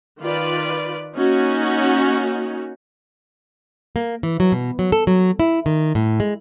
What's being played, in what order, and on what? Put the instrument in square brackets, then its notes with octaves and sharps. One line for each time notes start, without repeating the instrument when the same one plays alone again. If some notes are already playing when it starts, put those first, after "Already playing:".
[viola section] D#3 F4 B4 D5
A#3 C#4 D#4 F#4
[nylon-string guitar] A#3
E3
F#3
B2
F#3
A4
F#3
E4
D#3
A2
G#3